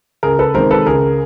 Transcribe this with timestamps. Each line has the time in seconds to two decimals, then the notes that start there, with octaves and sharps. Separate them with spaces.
0.23 C#2 G#4 A#4
0.39 A4 B4
0.54 C3 D#3 G#3 A#4 C5
0.71 A4 B4
0.86 C#2 G#4 A#4